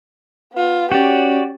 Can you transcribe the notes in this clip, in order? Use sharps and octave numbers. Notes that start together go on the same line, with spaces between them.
B3 F4
C#4 F#4 G4 D5